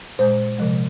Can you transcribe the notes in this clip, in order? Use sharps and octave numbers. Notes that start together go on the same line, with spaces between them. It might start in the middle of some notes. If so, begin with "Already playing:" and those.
A#2 G#3 C5
C3 F3 G#3